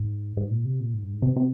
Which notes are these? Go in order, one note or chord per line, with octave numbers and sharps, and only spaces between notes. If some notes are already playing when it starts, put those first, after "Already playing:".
Already playing: G#2
G#2
A#2
C3
A#2
G#2
G2
G#2
C3
C3